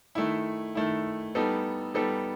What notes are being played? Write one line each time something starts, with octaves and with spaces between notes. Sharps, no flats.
D#3 A3 E4
D#3 A3 E4
G3 B3 D#4 A4
G3 B3 D#4 A4